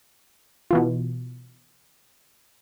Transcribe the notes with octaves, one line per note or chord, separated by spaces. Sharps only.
B2 E3 F4